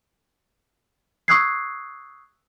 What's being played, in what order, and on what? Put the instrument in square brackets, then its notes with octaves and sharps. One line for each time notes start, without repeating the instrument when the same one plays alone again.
[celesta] C#6 D#6 E6 F#6 G#6 C7